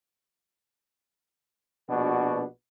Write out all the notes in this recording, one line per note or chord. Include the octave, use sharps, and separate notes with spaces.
A#1 B2 D4 F#4 B4